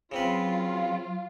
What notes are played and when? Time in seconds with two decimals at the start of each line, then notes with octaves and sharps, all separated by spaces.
0.12 C#3 F#3 C4 F4 B4